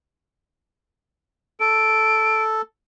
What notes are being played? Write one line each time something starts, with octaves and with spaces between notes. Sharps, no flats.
A4 D7